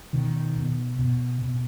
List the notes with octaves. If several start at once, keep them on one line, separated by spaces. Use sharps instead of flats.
B2 D#3
B2
B2
B2